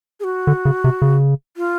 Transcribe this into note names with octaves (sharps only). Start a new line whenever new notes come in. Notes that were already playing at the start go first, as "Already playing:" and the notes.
G#4
F#4
D3
C#3
C3
C#3
F4